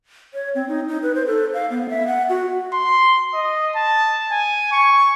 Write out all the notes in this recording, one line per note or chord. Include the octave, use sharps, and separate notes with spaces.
C#5
C4
D#4
D#4
B4
C5
A4
F5
B3
E5
F#5
F#4
C6
D#5
A5
G#5
C#6